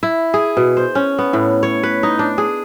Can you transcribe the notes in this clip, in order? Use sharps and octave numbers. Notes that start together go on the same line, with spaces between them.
E4
G#4
B2
C5
C#4
B3
A2
C#5
B4
D#4
D4
G#4